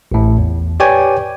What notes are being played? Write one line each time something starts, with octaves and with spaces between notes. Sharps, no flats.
A1 A2
E2
G4 B4 C#5 D5 G5 G#5